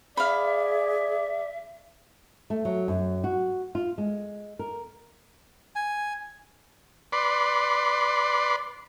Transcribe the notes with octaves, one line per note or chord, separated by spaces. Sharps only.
G#4 D5 E5 F5 B5
A3
F#3
F#2
F#4
F4
G#3
A#4
G#5
B4 D5 C6